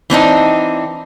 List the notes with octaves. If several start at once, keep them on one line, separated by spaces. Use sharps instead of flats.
E3 C4 D4 D#4